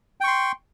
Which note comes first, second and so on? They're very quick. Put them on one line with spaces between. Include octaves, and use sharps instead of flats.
G5 C#6 C6